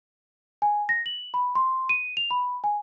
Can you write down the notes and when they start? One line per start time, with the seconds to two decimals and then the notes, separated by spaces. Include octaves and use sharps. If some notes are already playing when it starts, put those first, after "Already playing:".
0.62 G#5
0.89 A#6
1.06 F#7
1.34 B5
1.55 C6
1.89 D#7
2.17 F7
2.31 B5
2.64 G#5